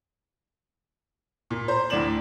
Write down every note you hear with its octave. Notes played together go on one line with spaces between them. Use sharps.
A#2
C5 A#5
D2 A2 D5 E7 F#7